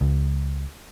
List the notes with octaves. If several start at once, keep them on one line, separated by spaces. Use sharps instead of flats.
C#2